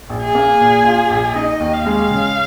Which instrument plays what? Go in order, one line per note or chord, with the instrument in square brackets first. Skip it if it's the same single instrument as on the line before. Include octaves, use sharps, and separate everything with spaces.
[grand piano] A#1
[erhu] G#4
[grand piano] A#3
A#2
F4
A#1
[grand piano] D#4 [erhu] D#5
[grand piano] D#2
[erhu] F5
[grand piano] G#3
C#3